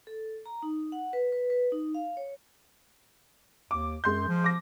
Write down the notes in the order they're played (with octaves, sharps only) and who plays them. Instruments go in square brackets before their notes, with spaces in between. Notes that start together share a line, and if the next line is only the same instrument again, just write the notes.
[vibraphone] A4
A#5
D#4
F#5
B4
B4
B4
D#4
F5
C#5
[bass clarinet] D#2 [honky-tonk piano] D6
[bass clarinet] F#2 [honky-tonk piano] G#3 C6 G6
[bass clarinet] F3
[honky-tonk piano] D6 A#6